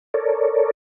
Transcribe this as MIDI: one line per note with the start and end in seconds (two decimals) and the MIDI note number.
0.14 0.71 69
0.14 0.71 70
0.14 0.71 73
0.14 0.71 74